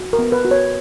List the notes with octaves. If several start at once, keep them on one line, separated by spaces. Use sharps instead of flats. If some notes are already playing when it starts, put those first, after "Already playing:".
Already playing: F#4
A#4
B3
B4
F#4
C#5